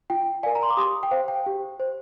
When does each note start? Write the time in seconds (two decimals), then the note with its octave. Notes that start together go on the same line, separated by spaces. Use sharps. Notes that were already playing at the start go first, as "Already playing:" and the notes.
0.10 F4 G5
0.43 A#4 D5 F5 G#5
0.55 A#5
0.63 C6
0.70 D6
0.77 G4 C6 D#6
1.03 G5
1.11 C5 F5
1.28 G5
1.46 G4
1.80 C5